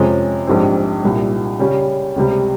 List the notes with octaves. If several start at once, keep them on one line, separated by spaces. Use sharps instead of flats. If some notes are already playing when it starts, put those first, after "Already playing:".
Already playing: F2 C3 F3 G#3 C#4
A#1 G#2 G3 C4
C2 A#2 G3
C#3 G3 C#4
C#2 C3 G3